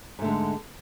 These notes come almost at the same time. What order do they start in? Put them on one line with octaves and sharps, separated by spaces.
G#2 A3 D3 G#3